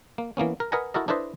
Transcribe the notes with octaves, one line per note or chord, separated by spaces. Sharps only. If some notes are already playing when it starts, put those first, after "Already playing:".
A#3
E3 A#3 B3 C#4
A#4
A#4 B4 D#5 F#5 G#5 A#5
E4 F#4 A4 A#4 D#5
D4 E4 A4 B4 C5 D#5